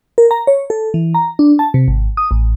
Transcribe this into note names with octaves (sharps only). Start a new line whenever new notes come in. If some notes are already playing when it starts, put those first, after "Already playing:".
A#4
A#5
C#5
A4
E3
A#5
D4
A5
C3
G#1
D#6
A1